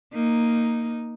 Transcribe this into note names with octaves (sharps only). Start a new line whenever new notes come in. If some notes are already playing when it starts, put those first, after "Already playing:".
A#3 D#4